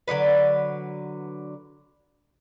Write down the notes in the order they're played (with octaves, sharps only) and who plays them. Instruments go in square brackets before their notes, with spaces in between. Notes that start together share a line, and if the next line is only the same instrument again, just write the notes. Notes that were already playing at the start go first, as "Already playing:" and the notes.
[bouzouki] D3 F#3 D#4 B4